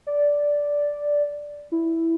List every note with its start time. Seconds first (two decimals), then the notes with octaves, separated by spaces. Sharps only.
0.07 D5
1.72 E4